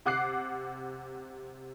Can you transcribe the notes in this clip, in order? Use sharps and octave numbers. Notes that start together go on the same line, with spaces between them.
C3 F#5 D6 F#6 C7